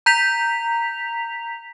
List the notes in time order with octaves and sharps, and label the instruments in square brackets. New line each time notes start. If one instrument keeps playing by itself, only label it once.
[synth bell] A#5 G6 B6 F7